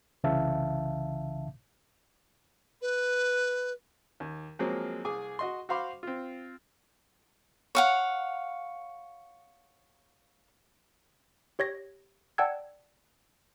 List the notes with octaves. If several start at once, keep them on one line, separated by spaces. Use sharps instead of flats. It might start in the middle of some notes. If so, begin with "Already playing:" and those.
C2 C#3 E3 E5 F5 A5
B4
D#2
F3 F#3 G#3 A#3 C4
C2 G#4 G#5 D6
F#4 D#5 C6
F#4 C5 F5 B5 C6 D6
C4 F4
C#5 F5 F#5
G4 C#5 G#6 A#6
D5 F#5 G5 A5 E6 G#6